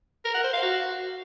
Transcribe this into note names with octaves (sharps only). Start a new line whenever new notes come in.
A#4
F#5
C5
F5
F#4